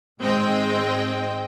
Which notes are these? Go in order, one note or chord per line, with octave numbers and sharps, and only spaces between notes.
G#1 G#3 C4 D#5 G5